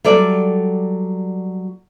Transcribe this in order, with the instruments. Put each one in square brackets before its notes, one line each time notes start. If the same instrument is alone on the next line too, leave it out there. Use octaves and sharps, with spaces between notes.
[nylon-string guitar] F#3 G3 A4 D5